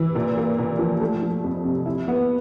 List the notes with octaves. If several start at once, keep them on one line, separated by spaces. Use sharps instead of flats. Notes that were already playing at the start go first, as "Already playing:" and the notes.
Already playing: E3
A#2
A#3
A#2
F3
A3
F3
F2
C3
E4
B3